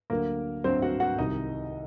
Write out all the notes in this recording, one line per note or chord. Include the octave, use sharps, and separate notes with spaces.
D2 D3 F#3 A#3 A#4
D2 D3 F#3 C4 C5
F#4 F#5
F#4 F#5
C2 C3 D#3 D#4 D#5